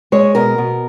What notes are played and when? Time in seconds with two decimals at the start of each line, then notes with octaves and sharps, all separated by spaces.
0.12 G#3 C#5
0.35 B2 A#4
0.58 B2